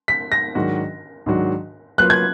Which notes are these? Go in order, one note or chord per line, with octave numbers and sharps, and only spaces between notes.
B6
A#6
G#2 D#3 F#3 D4 F#4
G#2 D#3 F#3 D4 F#4
F#3 A#3 F4 B4 F#6
G#6